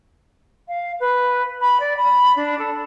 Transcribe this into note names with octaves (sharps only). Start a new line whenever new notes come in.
F5
B4
B5
D5
B5
D4
A4